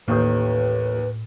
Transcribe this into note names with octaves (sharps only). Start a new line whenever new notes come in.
A1 D#2 A2 D#3 B4 C5